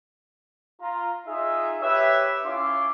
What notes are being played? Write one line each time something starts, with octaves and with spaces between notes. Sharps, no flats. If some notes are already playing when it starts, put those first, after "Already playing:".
F4 A#5
D#4 F4 G#4 E5
G4 B4 C#5 E5
C#4 E4 F4 C#5 C6 D6